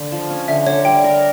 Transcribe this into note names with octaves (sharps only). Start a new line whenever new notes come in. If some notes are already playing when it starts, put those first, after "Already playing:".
Already playing: D3
F3
C#4
D3 E5
D3 C#5
G3 G5
A#4